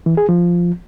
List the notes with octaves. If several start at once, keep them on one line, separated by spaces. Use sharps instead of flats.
E3
G#4
F3